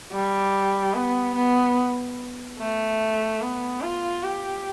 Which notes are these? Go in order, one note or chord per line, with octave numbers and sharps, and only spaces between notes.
G3
B3
B3
A3
B3
F4
G4